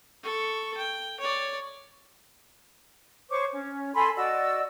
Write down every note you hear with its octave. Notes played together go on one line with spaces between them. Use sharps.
A4 C#6
G5
C#5 D5
C5 C#5 C#6 D6
C#4
A4 G#5 B5 C6
F#4 D5 D#5 E6